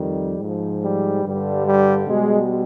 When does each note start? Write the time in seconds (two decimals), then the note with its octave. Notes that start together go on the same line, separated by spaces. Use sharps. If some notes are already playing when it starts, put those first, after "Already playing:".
Already playing: F2 D#3 G3
0.38 G#2 F3
0.82 G3
1.23 G2 D3 G3
1.65 G3
2.07 B2 G3 G#3